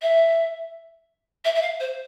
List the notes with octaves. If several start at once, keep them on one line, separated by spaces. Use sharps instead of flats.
E5
E5
E5
F5
C5